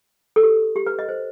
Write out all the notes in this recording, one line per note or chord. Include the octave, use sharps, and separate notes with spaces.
A4
G4
G4
B4
D#5
C5